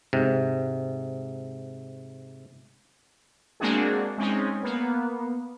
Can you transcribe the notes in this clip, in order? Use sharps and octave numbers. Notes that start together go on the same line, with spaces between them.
G#2 C3
G#3 A#3 C4 D4 F#4 G#4
G#3 C4 C#4 D#4
A#3 B3